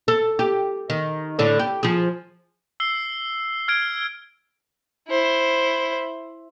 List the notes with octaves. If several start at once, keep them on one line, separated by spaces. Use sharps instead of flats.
A4
G4
D#3
A2 D3 D4
G4
F3 G#4
E6 C7 G7
F6 G#6 D7
E4 C5